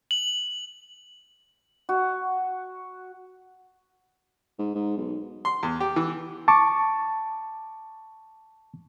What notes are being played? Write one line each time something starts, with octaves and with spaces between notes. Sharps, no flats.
F#7
F#4
G#2
G#2
B1
C6
E2
G4
E3
A5 C#6 D6